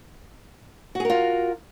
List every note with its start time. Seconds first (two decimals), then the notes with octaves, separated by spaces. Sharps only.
0.95 F#4
1.00 G#4
1.05 A#4
1.10 F4